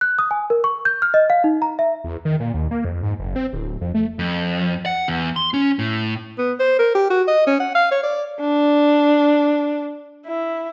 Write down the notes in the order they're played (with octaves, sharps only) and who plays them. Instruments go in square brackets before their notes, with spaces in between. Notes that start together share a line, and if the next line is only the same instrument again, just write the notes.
[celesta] F#6
D#6
G#5
A#4
C#6
G6
F6
D#5
F5
D#4
A#5
E5
[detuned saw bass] E2
D#3
A#2
D#2
A#3
F2
G#2
F#1
C4
D1
F2
A3
[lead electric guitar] F2
F#5
E2
C6
C#4
A2
[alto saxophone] B3
C5
A#4
G4
F#4
D#5
C#4
F#5
F5
C#5
D5
[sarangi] D4
E4